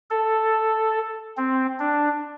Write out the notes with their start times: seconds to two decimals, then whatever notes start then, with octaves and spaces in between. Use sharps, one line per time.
0.10 A4
1.37 C4
1.80 D4